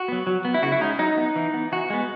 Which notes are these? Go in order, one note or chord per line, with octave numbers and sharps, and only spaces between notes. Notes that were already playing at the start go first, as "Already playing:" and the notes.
Already playing: F#4
F#3 B3
F#3
B3
E4
C#3 F#4
E4
G#3 C#4 D#4
F#3 D#4
B3
E3
B3
E3 F#4
G#3 B3